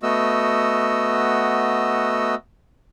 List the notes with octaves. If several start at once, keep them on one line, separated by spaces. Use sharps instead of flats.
A3 B3 F#4 D#5 E6